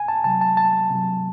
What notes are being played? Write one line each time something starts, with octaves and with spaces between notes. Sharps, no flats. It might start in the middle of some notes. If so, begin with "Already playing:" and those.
Already playing: C2 G#5
A5
C3 F#3 A5
A5
C2 A5
C3 F#3